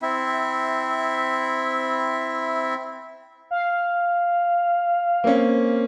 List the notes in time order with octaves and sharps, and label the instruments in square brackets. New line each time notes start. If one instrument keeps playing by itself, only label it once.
[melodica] C4 E4 E5
[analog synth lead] F5
[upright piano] A#3 C4 C#4